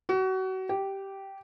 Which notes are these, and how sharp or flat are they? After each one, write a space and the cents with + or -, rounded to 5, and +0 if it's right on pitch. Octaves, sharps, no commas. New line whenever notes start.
F#4 +30
G4 -10